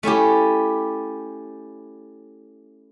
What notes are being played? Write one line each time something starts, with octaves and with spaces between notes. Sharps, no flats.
A3 C#4 E4 G4